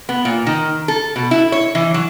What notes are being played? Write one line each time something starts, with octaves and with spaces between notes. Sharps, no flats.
B3
A#2
D#3
A4
B2
E4
C#5
E3
F#3